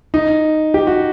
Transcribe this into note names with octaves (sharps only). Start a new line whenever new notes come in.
D#4
G4
F#4